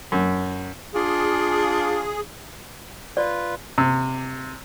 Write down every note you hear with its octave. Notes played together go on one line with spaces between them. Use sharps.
F#2
D4 F4 G#4
F4 B4 D5
C3